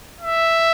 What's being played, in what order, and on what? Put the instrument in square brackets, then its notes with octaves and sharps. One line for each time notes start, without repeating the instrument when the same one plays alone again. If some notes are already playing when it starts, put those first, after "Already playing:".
[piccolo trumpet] E5